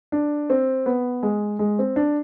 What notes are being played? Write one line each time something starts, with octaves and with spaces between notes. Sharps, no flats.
D4
C4
B3
G#3
G#3
C4
D4